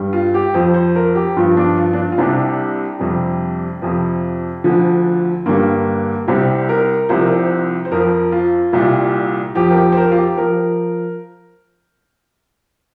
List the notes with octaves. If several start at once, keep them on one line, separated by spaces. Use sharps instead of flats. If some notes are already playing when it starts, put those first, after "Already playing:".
Already playing: G2 G3
F4
G4
F2 F3 C5
C5
A#4
G4
G2 F3 F4
D4
F4
D4
F4
F4
C2 C3 G3 D4
F2 C3 G3
F2 C3 F3
D2 D3 F3
G2 D3 G3 A#3
C2 C3 G3 C4
A#4
C2 C3 F3 C5
A#4
C5
C5
F2 F3 A#4
F4
C2 A#2 G3
F2 F3 G4
A#4
G4
C5
A#4
F4
G4
F3 A#4